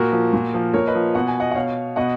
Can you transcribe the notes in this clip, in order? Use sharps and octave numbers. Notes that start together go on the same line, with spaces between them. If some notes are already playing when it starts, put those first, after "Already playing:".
Already playing: A#2 F#4 A#4
F3
A#2
F3
A#2 A#4 C#5
B4 D#5
F3
B2 F#5
G#5
D#5 F#5
F#5
B2 C#5 F5
B2 D#5 F#5